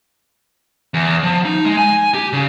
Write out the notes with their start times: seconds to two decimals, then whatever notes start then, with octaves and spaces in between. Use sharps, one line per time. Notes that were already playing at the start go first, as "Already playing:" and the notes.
0.94 E2
1.23 F3
1.45 D#4
1.66 G#3
1.77 G#5
2.14 G4
2.33 C#3